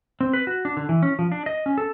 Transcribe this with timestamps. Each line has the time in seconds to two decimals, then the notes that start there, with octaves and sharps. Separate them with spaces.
0.21 C4
0.33 B4
0.47 F#4
0.65 D4
0.77 D3
0.89 E3
1.03 C#4
1.19 F3
1.32 D4
1.46 D#5
1.66 C#4
1.78 A4